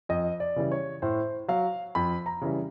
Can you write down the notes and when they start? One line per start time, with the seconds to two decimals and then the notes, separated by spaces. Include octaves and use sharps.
0.09 F2 D#5
0.40 D5
0.56 C#3 E3 G3
0.72 C#5
1.02 A2 C5
1.48 F#3 F5
1.95 F2 B5
2.26 A#5
2.41 C#3 E3 G3